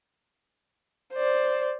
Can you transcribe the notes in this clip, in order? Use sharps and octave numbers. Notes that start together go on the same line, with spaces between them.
C5 D5